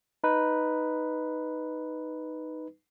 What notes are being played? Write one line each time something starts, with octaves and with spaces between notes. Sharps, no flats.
D#4 B4